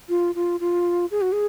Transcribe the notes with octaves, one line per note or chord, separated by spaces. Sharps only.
F4
F4
F4
G#4
F#4
G#4